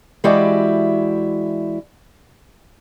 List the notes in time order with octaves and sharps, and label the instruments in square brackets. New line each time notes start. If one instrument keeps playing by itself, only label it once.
[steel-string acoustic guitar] E3 G#3 E4 F#4 G4 D5